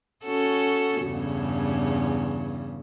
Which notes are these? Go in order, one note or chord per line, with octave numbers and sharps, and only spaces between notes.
C#4 F#4 A4
E2 G2 C#3